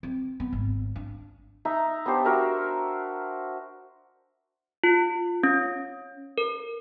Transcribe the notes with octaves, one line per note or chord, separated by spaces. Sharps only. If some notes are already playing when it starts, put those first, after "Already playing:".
C4
B3
G#1
D4
D#4 E5 A#5
B3 D4 G4 C5
F#4 A#4 E5
F4
C#4
A#4